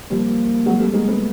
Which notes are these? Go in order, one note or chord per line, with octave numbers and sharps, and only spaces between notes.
F3 G3 A#3
F#3 G#3
G3 A3
G#3 A#3
A3 B3